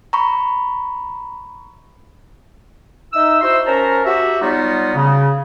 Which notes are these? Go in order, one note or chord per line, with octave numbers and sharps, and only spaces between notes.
A#5 B5 C#6
D#4 E5 E6
E4 F#4 C5 C6 E6
C#4 A#4 C5 A5 A#5
F#4 G4 E5
F#3 G3 B3 D#4 F4 F#4
C#3